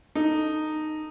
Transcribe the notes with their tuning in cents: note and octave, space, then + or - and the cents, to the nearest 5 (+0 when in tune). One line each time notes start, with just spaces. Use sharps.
D#4 -10 A4 +0